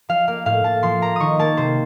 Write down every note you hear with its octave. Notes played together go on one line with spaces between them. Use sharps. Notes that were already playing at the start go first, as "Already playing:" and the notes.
F3 F5
A#3 F5
A2 F5
A2 A5
F3 C6
A#3 A#5
D#3 C#6 D#6
A#3 A5
C3 C5